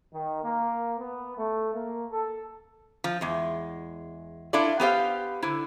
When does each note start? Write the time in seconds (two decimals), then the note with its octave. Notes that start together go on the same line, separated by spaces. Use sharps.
0.13 D#3
0.43 A#3
0.99 B3
1.38 A3
1.73 A#3
2.12 A4
3.04 F3
3.21 E2 G#3
4.53 D4 E4 F4 A4 D5
4.80 B3 G4 C5 F5
5.42 D3 E4